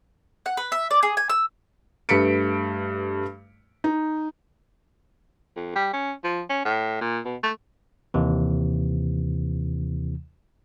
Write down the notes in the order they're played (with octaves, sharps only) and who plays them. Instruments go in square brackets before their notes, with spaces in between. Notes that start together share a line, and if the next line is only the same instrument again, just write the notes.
[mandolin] F#5
B4
E5
D5
G#4
G#5
E6
[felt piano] G2 A3 B4 B6 C#7 D7
D#4
[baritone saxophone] F2
G3
C#4
F3
C#4
A2
A#2
B2
A3
[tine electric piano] D#2 C3 E3